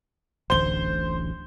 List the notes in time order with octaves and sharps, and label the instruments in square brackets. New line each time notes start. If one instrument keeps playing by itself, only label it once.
[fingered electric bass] D1 A1 D2 [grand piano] C5 G7